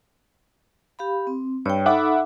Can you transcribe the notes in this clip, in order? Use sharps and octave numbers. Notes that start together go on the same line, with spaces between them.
G4 F5 B5
C4
G2 C#5 G5
D#4 A4 E5 F#5 B5 D6